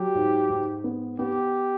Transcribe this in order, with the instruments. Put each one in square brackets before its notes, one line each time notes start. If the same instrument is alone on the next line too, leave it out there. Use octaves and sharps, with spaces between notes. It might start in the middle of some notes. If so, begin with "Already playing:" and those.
Already playing: [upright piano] F#3 [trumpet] G4
[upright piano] G#2
G#2
B3
[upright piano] B3 [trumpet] G4